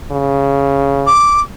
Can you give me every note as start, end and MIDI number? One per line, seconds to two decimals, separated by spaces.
0.11 1.11 49
1.07 1.41 86